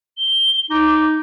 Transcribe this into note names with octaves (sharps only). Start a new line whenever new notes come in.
G7
D#4 D6